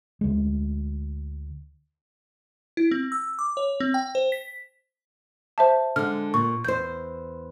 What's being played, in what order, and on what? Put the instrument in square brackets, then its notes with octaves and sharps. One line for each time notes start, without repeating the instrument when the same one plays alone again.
[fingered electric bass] D2 G#3
[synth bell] E4
C4
E6
D6
C#5
C4
G5
C5
B6
[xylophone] C5 E5 A5
[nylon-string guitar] D3 G#3 [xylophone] F6
[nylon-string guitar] A#2 [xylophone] C#6
[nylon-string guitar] E2 C5 [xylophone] G6